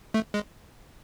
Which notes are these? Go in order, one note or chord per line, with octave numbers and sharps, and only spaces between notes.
A3
G#3